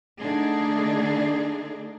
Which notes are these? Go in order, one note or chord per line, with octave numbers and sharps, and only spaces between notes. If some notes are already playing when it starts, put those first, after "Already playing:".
D3 A3 D4 D#4 G#4